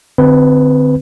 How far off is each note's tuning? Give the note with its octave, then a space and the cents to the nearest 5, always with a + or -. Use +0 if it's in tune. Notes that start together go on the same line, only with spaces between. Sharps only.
D3 +20 C4 -25 B4 +0